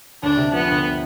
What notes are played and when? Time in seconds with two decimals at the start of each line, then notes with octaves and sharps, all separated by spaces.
0.23 D2 D4
0.37 C3
0.53 F3 B3
0.68 D2